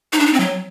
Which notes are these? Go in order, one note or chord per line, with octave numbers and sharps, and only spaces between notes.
D#4
D4
D#4
C4
F#3